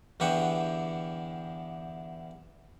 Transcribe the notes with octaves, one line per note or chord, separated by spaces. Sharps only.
E2 D3 E3 G4 F#5 C#6